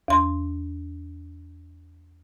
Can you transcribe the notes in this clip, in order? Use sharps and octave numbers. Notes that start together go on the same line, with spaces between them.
E2 C6